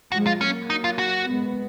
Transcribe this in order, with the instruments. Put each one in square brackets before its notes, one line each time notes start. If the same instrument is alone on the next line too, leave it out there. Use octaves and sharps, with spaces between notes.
[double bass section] F3 G#3 [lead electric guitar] F#4
[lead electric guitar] F4
[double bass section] F#3 A#3 [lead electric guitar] C#4
[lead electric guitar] D#4
F4
F#4
[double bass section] G#3 B3